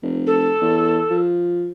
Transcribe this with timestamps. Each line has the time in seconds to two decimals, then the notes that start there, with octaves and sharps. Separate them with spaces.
0.02 F1
0.27 A4
0.61 E2
1.11 F3